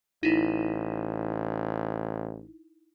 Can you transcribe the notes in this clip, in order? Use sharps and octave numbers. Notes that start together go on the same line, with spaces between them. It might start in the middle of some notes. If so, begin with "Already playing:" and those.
A1 D#4 E4